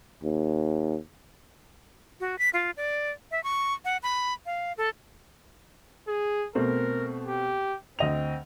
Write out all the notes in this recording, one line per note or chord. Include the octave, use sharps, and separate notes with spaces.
D#2
F#4
B6
F4
D5
E5
C#6
F#5
B5
F5
A4
G#4
B2 A3 C4 A#4
G4
D2 C4 D#5 F7